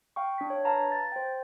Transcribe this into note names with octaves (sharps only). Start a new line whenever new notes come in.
F5 G5 C#6
D4 B6
C#5
B4 F5 A5 A#5
A6
C5 G5